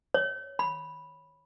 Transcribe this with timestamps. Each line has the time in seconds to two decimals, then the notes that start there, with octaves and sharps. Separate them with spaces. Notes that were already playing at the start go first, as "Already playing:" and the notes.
0.14 C#5
0.59 B5